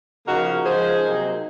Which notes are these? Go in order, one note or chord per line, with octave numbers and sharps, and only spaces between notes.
C#3 F3 A#3 D#4 F#4 A#4
C#3 F3 G#3 D#4 G#4 C5
C3 F#3 A#3 D#4